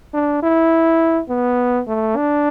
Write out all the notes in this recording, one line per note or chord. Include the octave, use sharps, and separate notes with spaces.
D4
E4
B3
A3
D4